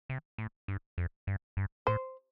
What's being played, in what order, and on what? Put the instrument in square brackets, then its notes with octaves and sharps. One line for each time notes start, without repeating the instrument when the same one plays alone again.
[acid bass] C3
A2
G2
F2
G2
G2
[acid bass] A2 [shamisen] C5